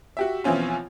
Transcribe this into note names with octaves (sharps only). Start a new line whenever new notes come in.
F#4 G4 E5
B2 E3 F3 C4 C#4 F4